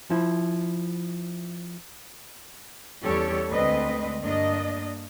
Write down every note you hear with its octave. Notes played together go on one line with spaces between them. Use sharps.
F3 E4
E2 G3 C#4 G4 A4 C#5
D2 D3 G#3 C4 B4 D#5
G2 A#3 D4 D#5